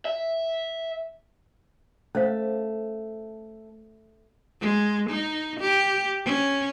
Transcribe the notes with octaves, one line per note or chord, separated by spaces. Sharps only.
E5
A3 C#4 C5 F5
G#3
D#4
G4
C#4